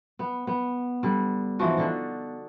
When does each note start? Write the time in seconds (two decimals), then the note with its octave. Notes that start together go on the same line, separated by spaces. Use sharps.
0.19 B3
0.47 B3
1.03 D3 G3
1.59 G#2 E3 F3 F#4
1.77 D3 D4 D#4